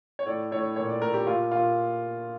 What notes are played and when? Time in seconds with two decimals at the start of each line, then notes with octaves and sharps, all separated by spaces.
0.19 C#5
0.26 A2 D5
0.51 A2 C#5
0.76 A#2 C#5
0.89 D5
1.02 A#2 A#4
1.14 G4
1.27 A#2 F4
1.51 A#2 F4